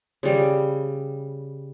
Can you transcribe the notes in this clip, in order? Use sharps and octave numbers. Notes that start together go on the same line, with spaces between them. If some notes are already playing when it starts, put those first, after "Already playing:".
C#3 G3